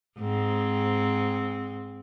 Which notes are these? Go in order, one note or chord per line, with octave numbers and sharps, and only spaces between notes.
G#2 C4